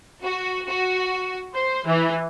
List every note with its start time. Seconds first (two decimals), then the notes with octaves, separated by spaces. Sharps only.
0.23 F#4
0.67 F#4
1.53 C5
1.86 E3